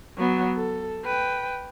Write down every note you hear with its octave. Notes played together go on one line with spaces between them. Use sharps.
F#3 B3
A4
B4 G5